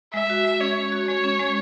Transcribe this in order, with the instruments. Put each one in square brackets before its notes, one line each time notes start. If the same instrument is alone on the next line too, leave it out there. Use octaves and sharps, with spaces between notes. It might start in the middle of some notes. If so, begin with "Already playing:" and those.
[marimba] G#3 [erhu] E5
[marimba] F#4
G#3
[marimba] C#4 [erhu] C#5
[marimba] G#3
F#4
[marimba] G#3 [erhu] C#5
[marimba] C#4
G#3